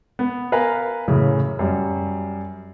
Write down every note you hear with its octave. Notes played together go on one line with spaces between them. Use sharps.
B3
A#4 B4 F5 G#5 A#5
F#2 A2 C#3 E3
F#2 G3